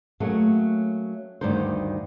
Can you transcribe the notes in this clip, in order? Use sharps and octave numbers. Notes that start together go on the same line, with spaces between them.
F#3 A3 A#3 C#4 G#4
D2 G2 D#3 D#4 C5